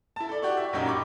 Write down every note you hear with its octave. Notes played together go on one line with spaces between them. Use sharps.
E4 A5
A4 D5
F#4 G4 D5 C#6
E5
A#1 F#2 F#3 D#4 G4
B5 C#6 D6